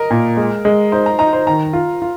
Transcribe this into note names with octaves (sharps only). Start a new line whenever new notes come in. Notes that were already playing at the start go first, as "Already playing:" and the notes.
Already playing: A#4 D#5
A#2
G#3
G#3
D#4 C5
A#5
D#4 A#5
C5
D#3 A#5
F4
F4